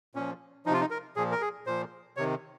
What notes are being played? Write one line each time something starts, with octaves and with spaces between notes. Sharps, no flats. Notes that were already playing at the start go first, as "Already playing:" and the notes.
A#2 F3 C#4
C3 F3 D#4 F4
D#4
A#4
A#2 F3 G#4
A#4
G#4
A#2 F3 C5
C3 D#3 C#5